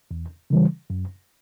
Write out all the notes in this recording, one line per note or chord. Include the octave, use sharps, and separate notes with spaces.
E2
C#3 E3 G3
F#2